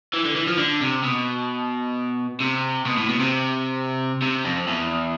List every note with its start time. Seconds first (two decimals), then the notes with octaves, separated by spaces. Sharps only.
0.13 E3
0.25 D3
0.36 E3
0.47 F3
0.58 D3
0.82 C3
1.04 B2
2.40 C3
2.86 B2
2.97 A2
3.09 B2
3.19 C3
4.22 C3
4.45 F2
4.68 E2